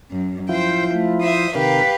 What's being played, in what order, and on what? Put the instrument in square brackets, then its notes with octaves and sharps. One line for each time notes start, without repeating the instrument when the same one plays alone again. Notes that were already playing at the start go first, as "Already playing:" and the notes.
[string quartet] F#2
[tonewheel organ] F3 E4 F4 [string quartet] C5 G5
[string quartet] A3
C5 E5 D#6
[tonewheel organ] C3 D#3 A#4 [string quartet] G4 B4 F5